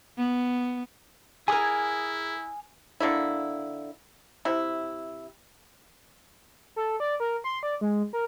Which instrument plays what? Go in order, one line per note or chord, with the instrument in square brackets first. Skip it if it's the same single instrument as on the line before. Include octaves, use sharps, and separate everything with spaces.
[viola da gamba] B3
[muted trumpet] E4 [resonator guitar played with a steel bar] G#4 A#4 [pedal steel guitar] G#5 D#6 F6
[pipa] D3 A#3 E4
C3 E4
[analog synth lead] A4
D5
A#4
C6
D5
G#3
A#4